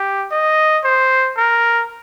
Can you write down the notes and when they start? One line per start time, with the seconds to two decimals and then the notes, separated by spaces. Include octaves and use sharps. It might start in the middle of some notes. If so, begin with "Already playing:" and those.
Already playing: G4
0.31 D#5
0.84 C5
1.37 A#4